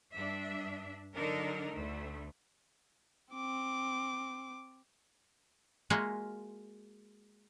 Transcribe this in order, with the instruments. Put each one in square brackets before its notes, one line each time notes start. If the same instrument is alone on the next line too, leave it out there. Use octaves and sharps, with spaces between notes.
[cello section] G2 D4 E5
D3 F#3 D4 D#4 A4 A#4
D2 A3
[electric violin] C4 D6
[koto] G#3 A#3 F4 F#4 D#5 E5